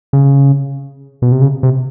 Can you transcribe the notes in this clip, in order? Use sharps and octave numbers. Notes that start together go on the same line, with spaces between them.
C#3
B2
C3
C#3
C3